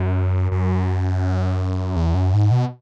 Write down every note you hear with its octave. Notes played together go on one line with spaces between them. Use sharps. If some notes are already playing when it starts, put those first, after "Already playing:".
Already playing: F#2
F#2
E2
F#2
G#2
B2